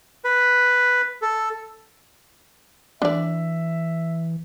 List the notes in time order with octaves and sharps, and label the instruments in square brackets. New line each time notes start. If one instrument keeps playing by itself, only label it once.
[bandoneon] B4
A4
[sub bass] E3 [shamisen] D4 D5 [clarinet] E5